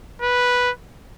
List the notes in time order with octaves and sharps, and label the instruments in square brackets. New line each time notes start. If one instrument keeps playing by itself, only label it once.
[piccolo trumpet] B4